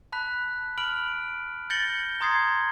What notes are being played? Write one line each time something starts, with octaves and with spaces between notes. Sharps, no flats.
A5 B5 F#6 B6
B5 F6 D7 F#7
G6 A6 A#6 C#7 F#7 G7
A#5 C6 D#6 G#6 A6 C7